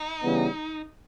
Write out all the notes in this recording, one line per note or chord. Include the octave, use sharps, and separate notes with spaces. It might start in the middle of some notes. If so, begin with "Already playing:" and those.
Already playing: D#4
C#3 E3 G3 B3